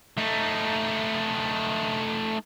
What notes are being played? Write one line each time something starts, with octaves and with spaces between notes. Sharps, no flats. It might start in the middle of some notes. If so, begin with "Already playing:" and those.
A3 D#4